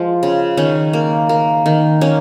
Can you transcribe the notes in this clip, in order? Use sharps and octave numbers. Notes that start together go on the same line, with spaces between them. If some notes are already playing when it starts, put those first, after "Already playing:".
Already playing: F3 G#3
C#3
D#3 C#4
A#3
A#3
D#3
A#3 C#4